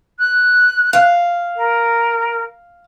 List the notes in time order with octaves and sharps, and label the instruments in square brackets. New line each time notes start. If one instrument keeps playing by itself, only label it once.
[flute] F#6
[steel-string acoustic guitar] F5
[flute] A#4